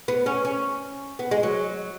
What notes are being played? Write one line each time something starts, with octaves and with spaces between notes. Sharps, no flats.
B3
C#4
C#4
B3
G#3
F#3